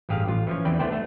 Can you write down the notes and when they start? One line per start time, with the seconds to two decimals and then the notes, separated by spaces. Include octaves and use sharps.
0.09 A1 G2 G4 G#4 F5
0.27 A1 F4
0.47 E3 F3 C#4
0.65 E2 E3 C4 B4 D5 G5
0.79 C2 A3 B3 D4 C5 G5
0.92 A3